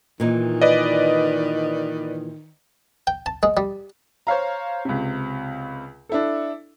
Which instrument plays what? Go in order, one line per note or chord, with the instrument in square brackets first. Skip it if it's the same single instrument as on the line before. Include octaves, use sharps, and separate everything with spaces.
[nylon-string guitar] A#2 E3 D#4 [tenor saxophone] D#3
[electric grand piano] B4 D5 D#5
[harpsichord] G5
A5
G#3
G3
[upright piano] C5 C#5 F5 A#5
C#2 C3
D4 E4 A4